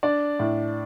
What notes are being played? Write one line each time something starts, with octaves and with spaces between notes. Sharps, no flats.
D4 D5
A2